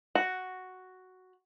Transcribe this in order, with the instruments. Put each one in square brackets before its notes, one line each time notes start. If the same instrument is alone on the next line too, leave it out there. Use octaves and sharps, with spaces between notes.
[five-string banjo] F#4